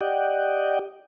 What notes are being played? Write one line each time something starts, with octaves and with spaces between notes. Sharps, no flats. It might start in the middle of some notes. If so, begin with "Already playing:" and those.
G4 D5 D#5 F#5 G5